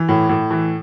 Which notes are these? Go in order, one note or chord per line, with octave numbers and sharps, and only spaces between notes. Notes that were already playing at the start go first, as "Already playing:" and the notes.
Already playing: E3
A2
A2
E3